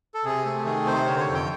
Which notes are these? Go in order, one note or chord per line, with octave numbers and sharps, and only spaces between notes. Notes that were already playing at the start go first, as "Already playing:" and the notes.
A4
C3 G#4
A3
D#3 G#4
C3 C5
D3 C#5
C5
C#5
F2
G5